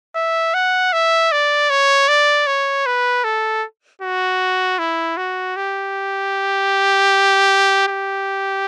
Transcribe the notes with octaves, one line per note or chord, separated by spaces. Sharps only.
E5
F#5
E5
D5
C#5
D5
C#5
B4
A4
F#4
E4
F#4
G4
G4